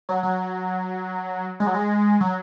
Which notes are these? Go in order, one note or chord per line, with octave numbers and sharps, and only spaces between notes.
F#3
F#3
G#3
F#3
G#3
F#3